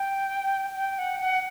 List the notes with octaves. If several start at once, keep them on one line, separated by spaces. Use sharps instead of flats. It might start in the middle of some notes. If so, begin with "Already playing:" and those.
Already playing: G5
G5
F#5
F#5